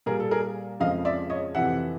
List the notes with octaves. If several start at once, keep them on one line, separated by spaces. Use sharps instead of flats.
A#2 G3 G#4 A#4
A4
G#4 A#4
F2 C#3 F3 G#3 D#5 F5
D5 E5
C#5 D#5
F2 C3 E3 E5 F#5